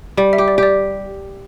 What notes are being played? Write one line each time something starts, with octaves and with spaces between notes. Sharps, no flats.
G3 D5
E5
G4
D5
G4
D5